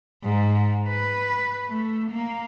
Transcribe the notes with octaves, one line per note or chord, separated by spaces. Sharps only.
G#2
B4
A3
A#3